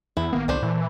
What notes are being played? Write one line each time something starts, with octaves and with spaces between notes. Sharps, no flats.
E2 E4
A1 D#3 A#3 B3
C2 A3 D4 C5
A#2 E3